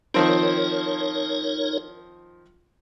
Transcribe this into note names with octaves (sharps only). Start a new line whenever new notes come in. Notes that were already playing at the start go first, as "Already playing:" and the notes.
D#3 F3 C4 D#4 A#4 C#5